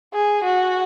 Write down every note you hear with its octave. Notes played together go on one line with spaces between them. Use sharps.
G#4
F#4